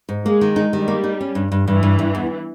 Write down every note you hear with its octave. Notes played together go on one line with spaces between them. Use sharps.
G#2
G#3 A#3
D#3
D#4
D#3 G3
A#3
D#4
C#4
G2
G2
G2 E3
G2
G2
E2